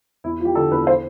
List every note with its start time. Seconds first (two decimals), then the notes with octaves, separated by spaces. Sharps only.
0.24 E2 E4
0.40 F3 G4
0.55 D3 A4
0.71 E2 B4
0.87 C5